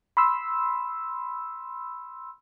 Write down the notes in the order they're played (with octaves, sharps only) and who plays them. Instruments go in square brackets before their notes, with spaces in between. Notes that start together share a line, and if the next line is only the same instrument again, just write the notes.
[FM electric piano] B5 C6 E6